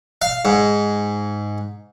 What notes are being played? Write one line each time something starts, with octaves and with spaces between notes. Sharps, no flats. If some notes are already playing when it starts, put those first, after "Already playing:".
F5
G#2